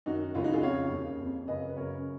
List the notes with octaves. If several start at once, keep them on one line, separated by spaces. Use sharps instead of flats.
F#2 D#3 D#4 F#4
C#2 C#3 C#4 F4
D#4 F#4
F4 G#4
F2 C#3 C#5 F5
D#2 C#3
F2 C#3
F#2 C#3 B4 D#5
B4
F#2 C#3 A#4 C#5